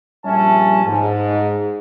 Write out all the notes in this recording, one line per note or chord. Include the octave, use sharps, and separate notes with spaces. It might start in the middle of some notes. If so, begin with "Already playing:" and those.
A#1 G3 C#4 E5 A5
G#2